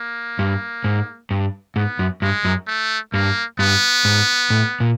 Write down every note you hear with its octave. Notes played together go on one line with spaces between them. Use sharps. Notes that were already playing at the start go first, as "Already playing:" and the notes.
Already playing: A#3
G2
G#2
G2
G#2 B3
F#2
G2 G#3
F#2
A3
G2 A#3
G2 B3
G#2
A2
A#2